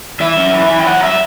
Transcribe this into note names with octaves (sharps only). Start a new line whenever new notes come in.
E3 E5
F#2
E3
E3
G5
F#3 F#5
F#3 E5